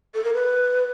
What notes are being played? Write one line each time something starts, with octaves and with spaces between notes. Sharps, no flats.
A4
A#4
B4